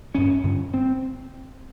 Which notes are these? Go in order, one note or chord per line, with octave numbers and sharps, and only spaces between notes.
G2 D3 C#4
G2 D3
C4